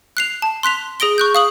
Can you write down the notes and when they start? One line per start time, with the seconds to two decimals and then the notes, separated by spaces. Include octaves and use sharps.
0.17 F#6 C7 F7
0.42 A5
0.63 C6 F#6 B6 F7
1.00 G#4 D#6 A#6 D7 G7
1.18 C#6 F#6 G6
1.35 F5 D#6 F#7